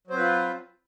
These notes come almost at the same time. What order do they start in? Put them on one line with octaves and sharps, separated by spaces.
F#3 C5 C4 B4 F4